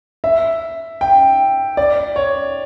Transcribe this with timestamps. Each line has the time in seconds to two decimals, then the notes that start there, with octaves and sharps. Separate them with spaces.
0.24 E5
1.01 G5
1.77 D5
2.16 C#5